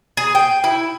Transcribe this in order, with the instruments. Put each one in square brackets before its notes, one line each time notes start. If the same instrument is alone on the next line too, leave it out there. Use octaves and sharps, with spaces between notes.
[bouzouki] G#4
G5
E4